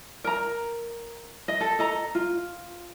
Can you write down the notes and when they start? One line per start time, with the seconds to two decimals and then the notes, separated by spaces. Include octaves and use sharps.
0.24 A#4 A#5
1.48 D#5
1.61 A4
1.79 A4 D#5 A#5
2.15 F4